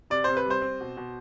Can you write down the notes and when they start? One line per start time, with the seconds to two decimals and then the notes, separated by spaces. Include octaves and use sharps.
0.10 C3 D5
0.24 C3 C5
0.37 B4
0.46 G3 C5
0.62 C4
0.80 B2
0.97 B2